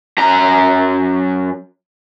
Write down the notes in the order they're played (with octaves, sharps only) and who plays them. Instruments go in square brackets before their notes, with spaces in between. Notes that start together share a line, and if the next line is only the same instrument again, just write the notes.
[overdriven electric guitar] F#2 A#5